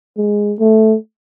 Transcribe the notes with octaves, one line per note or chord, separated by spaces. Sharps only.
G#3
A3